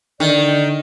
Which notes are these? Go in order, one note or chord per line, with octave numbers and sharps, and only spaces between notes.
D3 D#3 D5